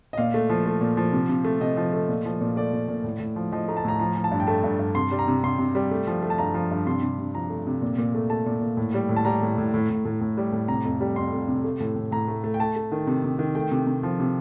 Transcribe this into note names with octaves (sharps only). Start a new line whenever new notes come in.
D#5
A#2 F5
A3
F3
A3
A#2
F3
C3
C3
A3
C3 D#5
F3
A3
A#2
F3
A#2
A3 D5
A#2
A#2
A2
A2
F3
F3 D#5
A3 A#5
A5
A2 A#5
F3 A#5
F3
A5
G2
G5
A3 A5
G2
G2
C3 C6
G3
A#5
C3
C3 C6
C3
G3
A3
F3
A3
A5
G2 A#5
F3
G2
C3 C6
C3
C3
F3 A#5
A3
C3
A#2
A#2
A3
A3 A5
A#2
A#2
A2
G3
A2
A5
G3 A#5
A2
A2
A2
A2
A2
A2
G3
A2
C3 A#5
F2
G3
F2 C6
F2
C3
A3
A2
A2
A2 A#5
A3
A3
G5
A3 A5
A3
D#3
C3
C3
D#3
A3 G5
C3
C3
F3
C3